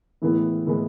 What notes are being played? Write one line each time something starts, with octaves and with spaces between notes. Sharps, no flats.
A2 E3 G#3 B3 E4
A2 E3 G#3 B3 E4